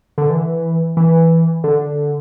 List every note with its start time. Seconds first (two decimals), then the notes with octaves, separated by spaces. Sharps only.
0.18 D3
0.30 E3
0.97 E3
1.64 D3